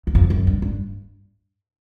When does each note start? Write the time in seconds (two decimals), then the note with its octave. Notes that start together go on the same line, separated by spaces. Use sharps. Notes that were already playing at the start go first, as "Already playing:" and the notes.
0.07 E2
0.15 F2
0.30 F#2
0.47 G2
0.62 G2